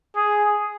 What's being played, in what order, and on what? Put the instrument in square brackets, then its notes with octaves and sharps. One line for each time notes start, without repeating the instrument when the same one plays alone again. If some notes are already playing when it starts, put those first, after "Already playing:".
[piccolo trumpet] G#4